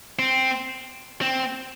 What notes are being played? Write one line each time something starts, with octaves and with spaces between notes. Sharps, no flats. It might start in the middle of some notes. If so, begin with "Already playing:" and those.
C4
C4